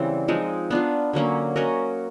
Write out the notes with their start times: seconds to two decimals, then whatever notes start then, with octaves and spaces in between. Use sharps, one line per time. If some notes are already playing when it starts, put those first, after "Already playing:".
Already playing: C#3 E3 G3 C4
0.28 F3 G#3 C4 D#4
0.70 B3 D4 F4
1.13 D3 F#3 A#3 C#4
1.56 C#4 F#4 A#4 D#5